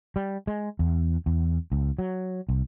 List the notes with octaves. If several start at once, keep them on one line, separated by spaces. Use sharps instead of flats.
G3
G#3
E2
E2
C#2
F#3
C2